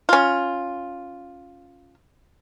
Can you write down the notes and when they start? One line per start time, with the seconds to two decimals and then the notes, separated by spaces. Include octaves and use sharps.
0.09 C#4 F4